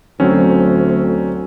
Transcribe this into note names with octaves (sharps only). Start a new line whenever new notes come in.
D2 F#3 C4 C#4